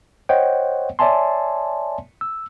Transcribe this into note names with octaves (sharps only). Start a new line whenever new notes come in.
C5 C#5 D#5 F#5 G5
C#5 D5 E5 G#5 A5 C6
E6